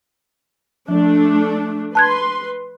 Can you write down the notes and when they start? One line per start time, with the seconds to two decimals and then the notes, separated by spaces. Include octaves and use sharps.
0.88 F3 A3 D4
1.95 B4 A5 C6 F#6 G#6